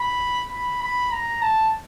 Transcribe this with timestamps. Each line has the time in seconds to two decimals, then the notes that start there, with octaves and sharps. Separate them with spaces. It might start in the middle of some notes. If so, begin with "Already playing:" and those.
Already playing: B5
0.52 B5
0.82 B5
1.12 A#5
1.42 A5